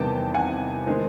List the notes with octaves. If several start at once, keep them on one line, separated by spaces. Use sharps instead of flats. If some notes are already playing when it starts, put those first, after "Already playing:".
Already playing: E2 C3 D#3 G3 B3 G5 A5
F#5 G#5
D#3 G#3 C4